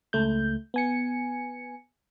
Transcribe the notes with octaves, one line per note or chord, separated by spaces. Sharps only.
C#2 A3 G6
B3 G#5 C#7